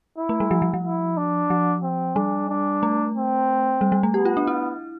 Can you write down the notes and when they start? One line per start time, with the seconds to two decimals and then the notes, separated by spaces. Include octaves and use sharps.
0.18 E4
0.29 A3
0.40 G3
0.51 F3
0.62 F3
0.74 F3
0.84 E4
1.17 D4
1.50 F3
1.83 C4
2.16 G3 D4
2.50 D4
2.83 A3
3.15 C4
3.81 G3
3.92 G3
4.03 A3
4.14 B3 G4
4.25 F4
4.37 D4
4.47 E4